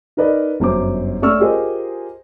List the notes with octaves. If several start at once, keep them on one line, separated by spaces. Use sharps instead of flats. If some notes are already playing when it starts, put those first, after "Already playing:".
D#4 A#4 B4 D5 D#5
G1 F#2 C5 D6
A3 C#4 D5 C#6 E6 F6
F4 G4 G#4 A#4 C5 D#5